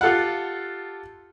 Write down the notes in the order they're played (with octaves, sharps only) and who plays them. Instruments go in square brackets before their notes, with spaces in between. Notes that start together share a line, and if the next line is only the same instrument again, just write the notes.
[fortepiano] F4 G4 A4 F5 F#5